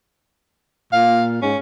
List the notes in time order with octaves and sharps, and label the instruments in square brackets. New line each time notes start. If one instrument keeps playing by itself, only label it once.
[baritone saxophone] A#2 [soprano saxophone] F5
[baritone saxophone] G#2 [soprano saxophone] C#4